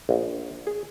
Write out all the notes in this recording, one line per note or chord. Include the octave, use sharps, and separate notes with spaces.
A#1
G#4